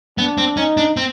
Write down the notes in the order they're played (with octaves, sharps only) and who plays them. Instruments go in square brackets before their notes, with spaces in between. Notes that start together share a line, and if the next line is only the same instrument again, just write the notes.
[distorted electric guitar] B3 [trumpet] D4
[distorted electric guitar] C4
[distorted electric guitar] C#4 [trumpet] D#4
[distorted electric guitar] D4
C4